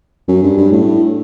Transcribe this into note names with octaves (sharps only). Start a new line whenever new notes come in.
F#2
G2
G2
A2